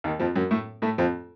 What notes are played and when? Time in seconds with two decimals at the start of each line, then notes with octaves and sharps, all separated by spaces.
0.04 D#2 D#3
0.19 F2 F3
0.36 F#2 F#3
0.51 A2 A3
0.82 A2 A3
0.98 F2 F3